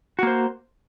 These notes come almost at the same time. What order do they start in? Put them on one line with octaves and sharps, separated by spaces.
F#4 A#3 C5